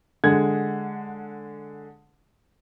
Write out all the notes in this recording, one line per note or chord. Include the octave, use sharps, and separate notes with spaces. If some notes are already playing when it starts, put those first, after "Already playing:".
D3 G#3 F#5 G#6